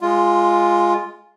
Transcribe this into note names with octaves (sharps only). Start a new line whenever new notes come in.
G#3 F4